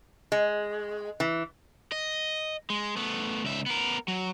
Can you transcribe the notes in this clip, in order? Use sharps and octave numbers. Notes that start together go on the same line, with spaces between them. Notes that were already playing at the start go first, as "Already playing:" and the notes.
G#3
E3
D#5
G#3
A3 B3
C#2 E5
B3 A#4
F#3